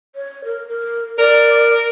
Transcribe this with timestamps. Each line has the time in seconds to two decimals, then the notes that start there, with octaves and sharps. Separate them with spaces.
0.16 C#5
0.44 A#4
0.67 A#4
1.18 A#4 D5